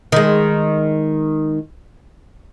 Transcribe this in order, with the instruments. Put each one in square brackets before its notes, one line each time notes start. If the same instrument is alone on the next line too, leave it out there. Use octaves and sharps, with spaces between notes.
[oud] D#3 G#3